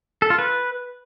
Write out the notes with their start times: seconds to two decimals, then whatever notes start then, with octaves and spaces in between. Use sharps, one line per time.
0.22 A4
0.30 F4
0.39 B4